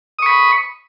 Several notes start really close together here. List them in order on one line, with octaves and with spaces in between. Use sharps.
D#6 C#6 B5